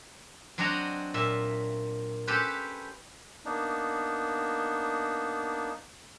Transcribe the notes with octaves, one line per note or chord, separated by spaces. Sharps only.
F#3 C4 D4 F#4 D#5 A#5
A#2 E5
C#4 G4 A4 B4 C5
A#3 B3 D4 D#4